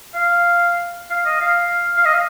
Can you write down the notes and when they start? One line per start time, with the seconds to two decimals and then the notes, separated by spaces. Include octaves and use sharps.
0.14 F5
1.10 F5
1.26 D#5
1.41 F5
1.97 F5
2.05 D#5
2.14 F5